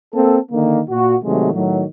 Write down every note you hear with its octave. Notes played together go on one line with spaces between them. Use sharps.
A#3 C4 A4
D3 D#3 A#3
A#2 F#4
C3 D#3 F#3 G#3 A3
A2 D#3 F#3